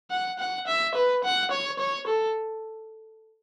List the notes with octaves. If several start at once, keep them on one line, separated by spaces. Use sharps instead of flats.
F#5
F#5
E5
B4
F#5
C#5
C#5
A4